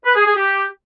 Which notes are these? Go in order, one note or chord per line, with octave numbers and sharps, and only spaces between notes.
B4
G#4
G#4
G4